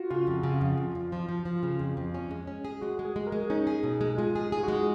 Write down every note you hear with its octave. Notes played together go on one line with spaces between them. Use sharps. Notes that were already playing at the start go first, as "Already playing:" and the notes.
Already playing: F4 F#4
C#3 F4
F2
C#3
F2
F2
F2
F3
F3
F3
C#3
F2
F2
C#4
G#3
C#4
G#4
G#3 F#4
G#3
G#4
G#3
A#4
G#3
C#4 D#4
G#4
B2
G#3
G#3 F4
G#4
G#4
F#4
G#3